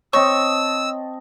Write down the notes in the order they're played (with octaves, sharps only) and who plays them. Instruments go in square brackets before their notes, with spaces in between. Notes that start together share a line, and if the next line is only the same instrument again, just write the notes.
[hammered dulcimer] C4 D#5 A5 [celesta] C#5 [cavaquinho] C#6 [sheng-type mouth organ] E6